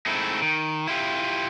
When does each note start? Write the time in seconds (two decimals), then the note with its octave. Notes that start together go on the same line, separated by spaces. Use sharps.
0.06 G#3 A3 C4 D#4 E4
0.42 D#3
0.88 E4 F4 G4